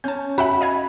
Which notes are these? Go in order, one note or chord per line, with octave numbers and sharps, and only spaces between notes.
C#4 A5 G6
F#4 E5 F#5 B5
D#5 F5 G#6